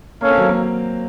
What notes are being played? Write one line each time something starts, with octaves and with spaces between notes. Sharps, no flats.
A#3 C#4 A4 C#5 F5
C4
F#3 A#3
A#3